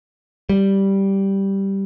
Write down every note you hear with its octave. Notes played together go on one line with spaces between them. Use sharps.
G3